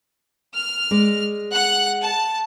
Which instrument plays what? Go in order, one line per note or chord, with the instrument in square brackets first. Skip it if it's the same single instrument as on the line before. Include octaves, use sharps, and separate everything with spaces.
[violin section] F6
[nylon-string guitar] G#3 D5
[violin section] F#5 F#6
A5